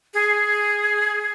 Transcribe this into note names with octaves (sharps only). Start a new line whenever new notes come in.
G#4